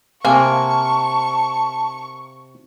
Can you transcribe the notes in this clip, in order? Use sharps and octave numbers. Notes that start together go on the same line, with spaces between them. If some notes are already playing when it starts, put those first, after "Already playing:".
C3 A#3 G#5 A5 C#6